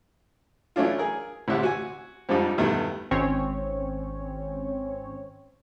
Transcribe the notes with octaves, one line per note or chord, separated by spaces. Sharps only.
E3 F#3 A3 C#4 D4 F4
G#4 A#4
A1 D2 C3 E5 F#5
F#4 G#5
F2 G#2 F3 G3 D4 D#4
E2 G2 B2 D#3 A3 B3
G#1 C4 C#4 C#5